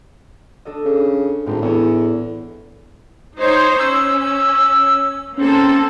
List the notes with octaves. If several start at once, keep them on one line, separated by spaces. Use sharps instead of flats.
D4 A4 D#5
C#3
G#1 A2 C4
E2 C#5 D#5
D#4 C5 C#5
C#4 E6
A#3 C4 C#4 A4